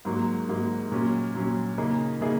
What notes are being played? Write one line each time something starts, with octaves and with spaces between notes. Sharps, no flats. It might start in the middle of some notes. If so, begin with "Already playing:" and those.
G#2 F#3 A#3
G#2 F#3 A#3
A#2 F#3 C#4
A#2 F#3 C#4
C#3 A#3 D#4 G#4
C#3 A#3 D#4 G#4